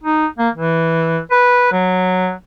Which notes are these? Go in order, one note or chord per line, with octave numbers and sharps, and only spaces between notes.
D#4
A#3
E3
B4
F#3